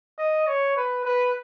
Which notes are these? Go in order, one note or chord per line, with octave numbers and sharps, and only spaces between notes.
D#5
C#5
B4
B4